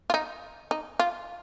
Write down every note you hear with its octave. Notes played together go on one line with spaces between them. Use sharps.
F4
D#4
D#4
F4